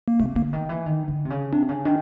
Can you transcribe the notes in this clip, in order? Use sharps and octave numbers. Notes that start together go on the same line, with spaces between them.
A#3
C3 A3
D3 A#3
D#3
E3
D#3
D3
C3
C#3
C3 D4
C#3
D#3 D4